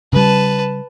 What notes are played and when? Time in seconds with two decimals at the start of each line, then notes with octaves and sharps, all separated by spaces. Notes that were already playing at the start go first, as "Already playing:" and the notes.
0.13 C#3 G3 B4 A5